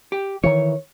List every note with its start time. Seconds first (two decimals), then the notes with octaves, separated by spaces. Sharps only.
0.12 G4
0.44 D#3 E3 C#5